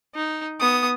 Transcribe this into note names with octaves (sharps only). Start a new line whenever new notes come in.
D#4
B3 D#6